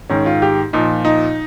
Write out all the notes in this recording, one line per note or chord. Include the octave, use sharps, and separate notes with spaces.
G#2 D#3 C#4
F4
G4
A#2 F3 D#4
D#4